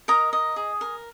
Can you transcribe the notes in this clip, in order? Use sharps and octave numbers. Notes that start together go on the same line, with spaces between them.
A#4 D#5 A#5
D#5
G#4
A#4